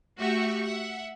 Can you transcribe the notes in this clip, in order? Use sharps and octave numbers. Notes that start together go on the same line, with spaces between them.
A3 F#4 G4 E5 F#5 C#6
E5 F#5